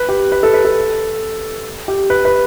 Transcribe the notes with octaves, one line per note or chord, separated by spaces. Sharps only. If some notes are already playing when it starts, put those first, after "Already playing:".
Already playing: B4
G4
B4
A4
B4
A4
G4
B4
B4